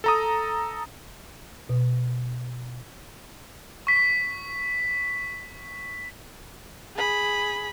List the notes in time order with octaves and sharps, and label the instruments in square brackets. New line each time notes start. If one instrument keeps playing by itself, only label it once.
[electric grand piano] A4 A#5 D#6
[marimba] B2
[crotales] C#6 B6
[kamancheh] G#4 B5